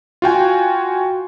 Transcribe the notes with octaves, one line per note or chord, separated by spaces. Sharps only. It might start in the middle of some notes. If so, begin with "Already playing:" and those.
F4 F#4 G5 G#5